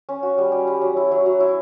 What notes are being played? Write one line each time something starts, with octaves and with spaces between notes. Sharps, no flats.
C#4
F#4
G3
G3
G3
F#3
E4
F#3
F#3
E4